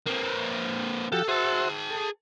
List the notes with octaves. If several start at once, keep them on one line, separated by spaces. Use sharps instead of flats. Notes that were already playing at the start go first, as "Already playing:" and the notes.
A#3 C4
F3 F#4 G4 A4
F#4 G#4 C5 E5 A5
A4